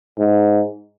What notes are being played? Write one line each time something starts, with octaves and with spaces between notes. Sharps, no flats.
G#2